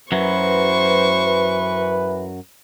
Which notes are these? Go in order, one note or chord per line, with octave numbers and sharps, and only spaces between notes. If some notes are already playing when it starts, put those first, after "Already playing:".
F#2 E3 F#3 B4 C5 C#6